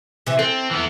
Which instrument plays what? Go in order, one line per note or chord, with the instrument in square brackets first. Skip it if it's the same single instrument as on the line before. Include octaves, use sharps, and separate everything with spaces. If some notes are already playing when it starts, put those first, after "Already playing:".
[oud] C3 E3
[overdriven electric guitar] C4 [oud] A4
[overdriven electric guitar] E3 B3